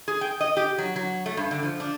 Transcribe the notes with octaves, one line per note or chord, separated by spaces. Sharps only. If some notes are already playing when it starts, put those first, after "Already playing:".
G#4
G5
D#5
G4
F#3
F#3
A3
G2
D3
F3
D4